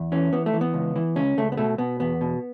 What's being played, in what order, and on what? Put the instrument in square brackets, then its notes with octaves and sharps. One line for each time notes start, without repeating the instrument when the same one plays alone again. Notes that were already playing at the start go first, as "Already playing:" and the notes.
Already playing: [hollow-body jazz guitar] E2
E3 C#4
E3 B3
A3
E3
B3
C#2
E3
C#2 C#4
C#2 A3
B3
B2 A3
B2 B3
E2 B3
B2